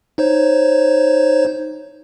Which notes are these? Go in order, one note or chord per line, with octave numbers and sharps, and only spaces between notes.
D#4 C5 C#5